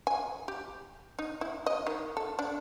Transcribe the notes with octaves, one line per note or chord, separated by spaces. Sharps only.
G#5
G4
D#4
E4
D#5
D#3
A4
D4